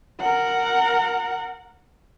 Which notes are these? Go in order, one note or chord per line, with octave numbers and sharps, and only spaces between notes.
A#4 F#5